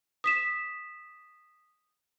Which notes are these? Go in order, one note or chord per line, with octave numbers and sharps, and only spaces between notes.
D#6 B6 E7